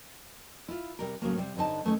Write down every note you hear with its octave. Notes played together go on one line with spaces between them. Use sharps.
E4 F4
C3 G3 A#4
A2 C#3 F#3 A#3
C3 G3
G2 D3 C4 D#4 A5
D#3 A3 B3 C#4 D#4